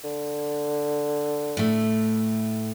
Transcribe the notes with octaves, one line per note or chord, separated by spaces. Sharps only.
D3
A2 A3